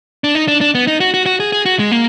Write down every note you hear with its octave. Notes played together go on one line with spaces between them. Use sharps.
D4
D#4
D4
D4
B3
D#4
F#4
F#4
F#4
G#4
G#4
F#4
G#3
A#3